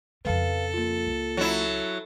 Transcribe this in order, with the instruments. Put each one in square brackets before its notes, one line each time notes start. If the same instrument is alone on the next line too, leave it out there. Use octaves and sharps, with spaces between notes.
[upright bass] F2 C#3 [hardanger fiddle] A4 [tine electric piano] B4 F5 A5
[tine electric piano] A#3 F4
[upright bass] C#2
[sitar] F#3 E4